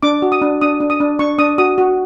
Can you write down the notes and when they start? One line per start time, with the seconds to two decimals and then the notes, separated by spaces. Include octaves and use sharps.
0.03 D4 D6
0.22 F#4
0.32 D#6
0.42 D4
0.61 D4 D#6
0.80 D4
0.90 D#6
1.00 D4
1.19 D4 C#6
1.38 D4 D#6
1.58 F#4 D#6
1.78 F#4